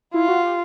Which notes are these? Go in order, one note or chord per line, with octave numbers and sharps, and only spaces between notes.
E4 F4
F#4
G4